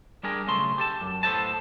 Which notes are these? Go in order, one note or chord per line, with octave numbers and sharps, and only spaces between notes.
G3 D4 G4 G#4 A#4
B1 C#3 A3 C6
G4 A4 A5
F#2
A2 B3 A4 C5 D#5 A5